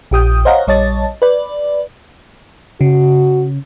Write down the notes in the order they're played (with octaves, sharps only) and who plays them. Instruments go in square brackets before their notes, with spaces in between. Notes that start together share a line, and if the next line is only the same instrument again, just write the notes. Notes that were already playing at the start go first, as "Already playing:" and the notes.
[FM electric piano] A#1 G4 D#6 G6
C5 C#5 D#5 F5 F#5 A#5
A#1 G3 C#5 D#5 A5 A6
B4 D5
[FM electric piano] C#3 [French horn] F#4